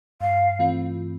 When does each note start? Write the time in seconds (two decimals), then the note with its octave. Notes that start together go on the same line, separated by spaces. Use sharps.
0.21 G2 F5
0.59 E3 A3 C4 F4